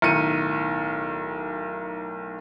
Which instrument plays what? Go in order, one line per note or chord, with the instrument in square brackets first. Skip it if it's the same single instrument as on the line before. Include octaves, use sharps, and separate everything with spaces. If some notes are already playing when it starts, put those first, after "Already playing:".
[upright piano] B1 A2 D#3 C#7 D#7